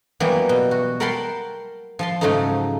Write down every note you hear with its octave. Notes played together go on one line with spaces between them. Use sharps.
E3 F#3 G3 A#3 B3 G4
B2
F#4
A#4 F#5 G5 A5 B5 C6
F3 A5 C6
G#2 C#3 F3 F#3 A3 D#4